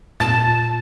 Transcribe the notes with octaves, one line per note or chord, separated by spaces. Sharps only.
A#2 A5 A6